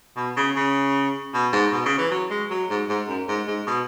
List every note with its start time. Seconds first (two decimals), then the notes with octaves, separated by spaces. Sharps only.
0.17 B2
0.37 C#3
0.56 C#3
1.34 B2
1.53 G#2
1.72 B2
1.85 C#3
1.98 E3
2.11 F#3
2.30 G#3
2.50 F#3
2.70 G#2
2.89 G#2
3.08 F#2
3.28 G#2
3.47 G#2
3.67 B2